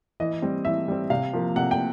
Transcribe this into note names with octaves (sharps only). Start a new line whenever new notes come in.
E3 D#5
G3 C4
E3 E5
G3 C4
C3 F5
F3 A#3
C3 F#5
G5